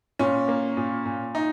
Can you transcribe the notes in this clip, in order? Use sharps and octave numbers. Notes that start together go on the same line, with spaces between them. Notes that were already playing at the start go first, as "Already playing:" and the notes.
A#2 C#4
A#3
A#2
A#2
D#4